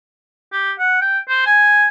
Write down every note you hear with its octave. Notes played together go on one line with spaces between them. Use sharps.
G4
F#5
G5
C5
G#5